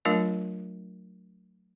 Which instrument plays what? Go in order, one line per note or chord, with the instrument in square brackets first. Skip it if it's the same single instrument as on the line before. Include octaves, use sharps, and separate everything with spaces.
[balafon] F#3 A3 D4 F4 A#4 F5